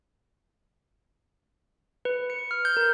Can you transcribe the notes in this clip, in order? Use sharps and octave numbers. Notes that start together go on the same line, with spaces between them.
B4
C#7
F6
G6
A#4